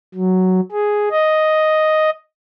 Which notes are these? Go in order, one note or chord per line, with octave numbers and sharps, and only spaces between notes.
F#3
G#4
D#5